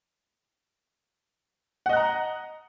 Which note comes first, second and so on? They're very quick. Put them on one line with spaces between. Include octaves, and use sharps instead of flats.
F#5 D#5 F#6 A#5